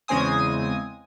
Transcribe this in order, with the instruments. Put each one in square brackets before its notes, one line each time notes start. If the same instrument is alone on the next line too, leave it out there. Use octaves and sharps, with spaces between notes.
[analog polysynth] E2 C#3 G#3 C4 G#5 D#6